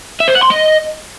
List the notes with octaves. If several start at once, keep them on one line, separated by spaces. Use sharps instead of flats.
E5
C5
F#5
C6
D#5